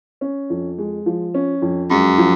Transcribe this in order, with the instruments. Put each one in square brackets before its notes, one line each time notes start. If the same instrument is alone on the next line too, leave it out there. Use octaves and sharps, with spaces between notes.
[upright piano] C#4
F2
G#3
F3
C#4
F2
[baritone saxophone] F#2 [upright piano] G#3
[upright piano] F3